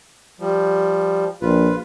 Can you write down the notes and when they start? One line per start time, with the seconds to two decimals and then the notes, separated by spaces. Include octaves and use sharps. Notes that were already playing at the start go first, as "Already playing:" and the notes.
0.40 F3 G3
1.42 A#1 F4 B4